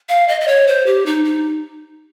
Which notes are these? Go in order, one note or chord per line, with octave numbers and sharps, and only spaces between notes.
F5
D#5
D#5
C#5
C5
G4
D#4
D#4